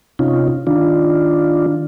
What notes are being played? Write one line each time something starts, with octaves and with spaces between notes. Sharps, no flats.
C3 C#4 D#4 F4
D#3 D4 F4